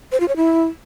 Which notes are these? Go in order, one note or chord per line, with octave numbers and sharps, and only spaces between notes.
C5
F4
C#5
E4